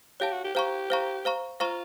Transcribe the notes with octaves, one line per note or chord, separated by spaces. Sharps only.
G4 C#5 F5 A5
F#4
G4
G4 C5 F5 A#5 C#6
C5 F5 A#5 C#6
C5 F5 A#5 C#6
F4 C5 F5 A#5 C#6